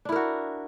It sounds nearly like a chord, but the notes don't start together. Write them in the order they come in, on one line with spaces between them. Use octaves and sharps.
D4 E4 A#4 F#4